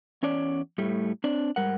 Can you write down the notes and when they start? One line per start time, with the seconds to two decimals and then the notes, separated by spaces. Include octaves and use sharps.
0.23 E2 C#4 C#5 D5
0.78 A2 G3 A3
1.24 C4 D4 D5
1.56 G#2 G3 A#4 F#5